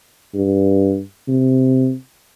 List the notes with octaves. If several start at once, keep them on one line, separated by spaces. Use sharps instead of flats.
G2
C3